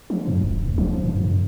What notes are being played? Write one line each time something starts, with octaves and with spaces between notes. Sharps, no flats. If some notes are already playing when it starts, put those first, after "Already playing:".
F3
F#2
D1
D2
F3
G2
F#2